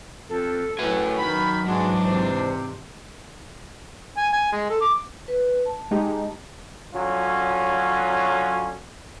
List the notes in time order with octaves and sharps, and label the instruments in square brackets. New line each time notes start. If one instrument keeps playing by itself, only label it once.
[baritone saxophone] F2 [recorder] A4
[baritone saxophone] A2 [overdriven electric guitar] F#3 G#5 [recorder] B4
[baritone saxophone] D#3 [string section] B5
[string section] G#2 E3 D4 [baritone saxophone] G#3 [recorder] F#4
[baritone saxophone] C3 [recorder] C5
[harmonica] G#5
G#5
G#3
A4
D6
[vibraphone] B4
A5
[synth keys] G#3 D#4 G4
[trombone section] D3 F#3 C#4 F4